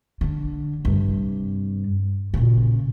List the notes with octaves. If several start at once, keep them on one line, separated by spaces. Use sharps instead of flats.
D3
G2 C3
A#2 C#3